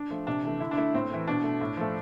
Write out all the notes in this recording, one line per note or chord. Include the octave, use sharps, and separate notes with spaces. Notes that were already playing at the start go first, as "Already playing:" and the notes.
Already playing: D4
F3 A3
C3 D4
E3 A3
D3 E4
D4
A3 E4
A2 C4
E3 A3
B2 D4
A3
A2
F3 A3